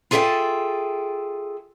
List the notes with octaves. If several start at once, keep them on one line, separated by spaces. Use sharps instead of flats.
F4 G#4 A4 C#5 E5 G5